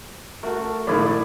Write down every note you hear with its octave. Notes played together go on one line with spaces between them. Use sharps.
A3 F#4 A#4
A#1 D#3 A3 E4 D5